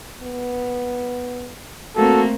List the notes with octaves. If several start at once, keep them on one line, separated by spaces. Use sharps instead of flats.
B3
A3 A#3 C4 F#4 A4